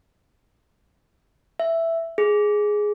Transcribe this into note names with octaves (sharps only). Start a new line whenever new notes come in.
E5
G#4